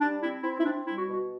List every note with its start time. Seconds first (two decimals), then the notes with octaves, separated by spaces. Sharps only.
0.01 G3 D4
0.22 C4 E4
0.43 C4 E4
0.59 E4
0.65 C4 D4
0.86 G3 E4
0.97 F#4
1.08 B2
1.13 F#4